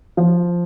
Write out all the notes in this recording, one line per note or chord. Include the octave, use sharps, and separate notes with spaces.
F3